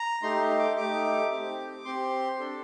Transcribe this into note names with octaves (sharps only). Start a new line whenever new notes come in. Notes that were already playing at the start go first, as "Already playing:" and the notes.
Already playing: A#5
A3 D#4 G4 C6
D6
A3 D#4 G4 D6
C4 G4
C4 G4 C6
D4 A4